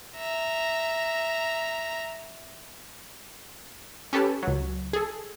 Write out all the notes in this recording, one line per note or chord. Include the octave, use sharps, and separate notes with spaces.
E5 A#5
C#4 G4 A4 B4 A5
C#2 F#3
G#4 A4